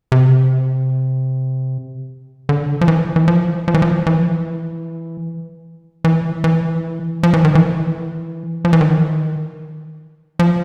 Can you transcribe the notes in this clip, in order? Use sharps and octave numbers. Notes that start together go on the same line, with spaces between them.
C3
D3
F3
E3
E3
F3
F3
E3
F3
E3
E3
E3
F3
E3
D#3
E3
F3
E3
D#3
F3